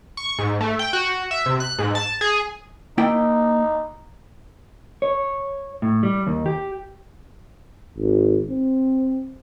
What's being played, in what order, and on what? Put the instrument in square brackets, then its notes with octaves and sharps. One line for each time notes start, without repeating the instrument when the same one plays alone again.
[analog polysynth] C#6
G#2
A3
G5
F#4
E5
C3
F#6
G#2
A5
G#4
[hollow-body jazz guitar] A#3 E4 G5 [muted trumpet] D#4
[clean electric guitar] C#5
A2
G3
D#2
G4
[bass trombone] G#1
C4